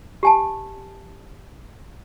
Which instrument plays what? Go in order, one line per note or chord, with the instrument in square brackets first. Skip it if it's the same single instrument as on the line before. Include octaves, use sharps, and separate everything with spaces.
[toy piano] G4 G#5 A5